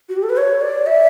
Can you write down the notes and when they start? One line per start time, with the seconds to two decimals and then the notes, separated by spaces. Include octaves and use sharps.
0.09 F#4
0.16 G4
0.23 A4
0.30 B4
0.37 C#5
0.61 D5
0.87 E5